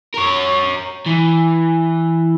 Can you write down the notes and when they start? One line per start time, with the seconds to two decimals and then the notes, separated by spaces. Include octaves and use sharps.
0.14 A#4 C#5
1.07 E3